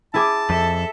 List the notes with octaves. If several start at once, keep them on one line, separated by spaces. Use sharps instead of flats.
E4 G#4 A5 D6
F2 A4 E5